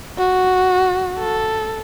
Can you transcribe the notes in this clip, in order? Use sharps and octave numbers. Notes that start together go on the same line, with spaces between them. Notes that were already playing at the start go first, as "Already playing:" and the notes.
F#4
A4